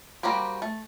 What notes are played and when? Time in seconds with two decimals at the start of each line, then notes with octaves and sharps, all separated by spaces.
0.23 G3 A#3 F#4 G4 C5
0.62 A3